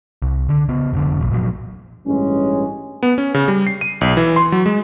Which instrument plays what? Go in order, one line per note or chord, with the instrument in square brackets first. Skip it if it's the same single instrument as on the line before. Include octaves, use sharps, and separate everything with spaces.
[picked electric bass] C2
D3
C#3 B3
F1 D3
E1 A#1
A#2 F3 F#3
[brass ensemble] A1 G2 G#3 C#4
[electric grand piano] B3
C#4
C#3
G3
C7
D#7
B1
E3
C6
F#3
G#3